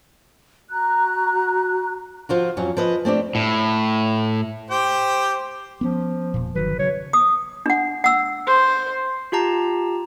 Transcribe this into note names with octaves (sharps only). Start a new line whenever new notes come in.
F#4 A#5 F#6
F3 F4 F#4
F2 F#3 C#4
F3 B4 D#5
A3 C4 D4 G4
A2
G4 C5 G5
F3 B3 C#4
E1 A#2
G1 D#3 F#3 B4
C#3 F#3 C#5
D#6
D4 F#5
F#5 E6
C5
F4 G4 A5 A#5